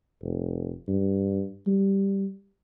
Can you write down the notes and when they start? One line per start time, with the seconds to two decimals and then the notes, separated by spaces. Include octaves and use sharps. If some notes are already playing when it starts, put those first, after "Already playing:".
0.22 F1
0.88 G2
1.67 G3